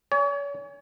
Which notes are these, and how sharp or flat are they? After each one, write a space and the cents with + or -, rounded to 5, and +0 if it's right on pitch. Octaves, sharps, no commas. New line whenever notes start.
C#5 +40 G#5 -10